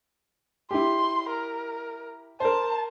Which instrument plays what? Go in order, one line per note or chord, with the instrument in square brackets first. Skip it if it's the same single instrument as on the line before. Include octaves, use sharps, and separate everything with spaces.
[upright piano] E4 G4 [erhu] C6
[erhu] A#4
[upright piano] A#4 C5 [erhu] A5